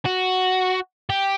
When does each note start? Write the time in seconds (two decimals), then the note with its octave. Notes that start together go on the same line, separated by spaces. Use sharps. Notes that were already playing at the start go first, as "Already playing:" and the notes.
0.05 F#4
1.10 G4